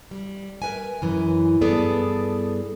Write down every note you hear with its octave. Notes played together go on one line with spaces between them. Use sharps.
G3
A#4 B4 E5 G#5
F#2 E3
G2 B3 G#4 A4 D5